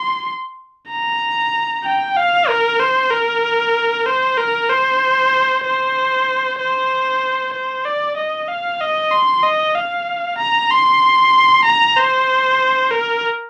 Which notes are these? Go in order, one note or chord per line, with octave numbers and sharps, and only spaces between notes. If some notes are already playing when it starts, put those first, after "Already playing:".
Already playing: C6
A#5
G5
F5
A#4
C5
A#4
C5
A#4
C5
C5
C5
C5
D5
D#5
F5
D#5
C6
D#5
F5
A#5
C6
A#5
C5
A#4